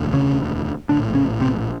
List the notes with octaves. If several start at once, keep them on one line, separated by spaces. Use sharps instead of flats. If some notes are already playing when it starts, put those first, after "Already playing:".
Already playing: E1 D2
C#3 C#4
A#1 A2 D3 D4
C#3 C#4
C3 C4